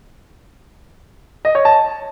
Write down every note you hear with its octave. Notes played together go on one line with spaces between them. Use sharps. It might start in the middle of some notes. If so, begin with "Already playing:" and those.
D#5
C#5
A5